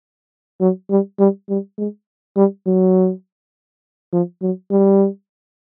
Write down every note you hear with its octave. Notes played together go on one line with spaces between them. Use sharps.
F#3
G3
G3
G3
G#3
G3
F#3
F3
F#3
G3